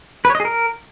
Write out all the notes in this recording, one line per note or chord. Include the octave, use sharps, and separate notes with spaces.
B4
C#5
D#5
G#4
A#4